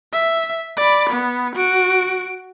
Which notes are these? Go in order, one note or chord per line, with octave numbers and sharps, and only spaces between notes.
E5
D5 B5
B3
F#4 D7